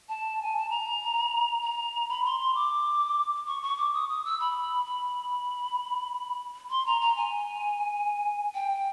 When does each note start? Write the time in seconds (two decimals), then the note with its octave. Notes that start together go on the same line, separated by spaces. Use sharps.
0.09 A5
0.42 G#5
0.57 A5
0.70 A#5
1.63 A#5
2.09 B5
2.25 C6
2.40 C6
2.54 D6
3.47 C#6
3.63 C#6
3.78 D6
3.94 D#6
4.09 D#6
4.25 E6
4.40 B5
4.85 B5
6.70 C6
6.86 A#5
7.01 A#5
7.16 G#5
8.55 G5